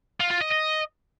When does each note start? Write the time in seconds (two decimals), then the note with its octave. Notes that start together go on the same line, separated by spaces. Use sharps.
0.20 F4
0.30 F4
0.41 D#5
0.51 D#5